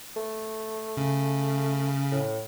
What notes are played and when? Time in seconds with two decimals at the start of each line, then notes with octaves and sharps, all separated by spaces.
0.17 A3
0.97 C#3
2.11 A2